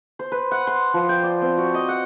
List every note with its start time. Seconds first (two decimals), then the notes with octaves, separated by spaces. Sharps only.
0.19 C5
0.32 B4
0.51 F#5
0.67 C6
0.94 F3
1.09 G5
1.23 D5
1.42 C4
1.58 F#4
1.74 D#5
1.88 F#5